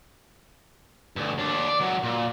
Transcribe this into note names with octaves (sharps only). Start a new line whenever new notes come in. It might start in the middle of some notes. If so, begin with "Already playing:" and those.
D2 G2
D#2 D4
D5
C#2 F#3
A#2